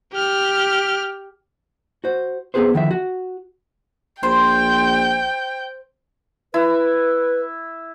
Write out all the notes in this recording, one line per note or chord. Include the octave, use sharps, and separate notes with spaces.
G4 F6
F#4 C5
B3 C4 D#4 G#4 B4 C5
D3 D#3 F3 E5
F#4
A#1 C5 G5 C6
E4 B4